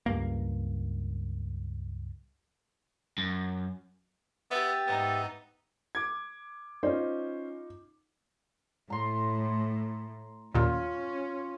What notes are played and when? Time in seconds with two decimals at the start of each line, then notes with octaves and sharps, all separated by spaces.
0.06 C#2 G2 A#3
3.18 F#2
4.51 B3 G4 E5 A6
4.86 G#2 B3 D#4
5.95 D6 G#6
6.83 C#4 D#4 F4 C5
8.90 A2 A#5 C6
10.55 D#2 A#2 C#4 F4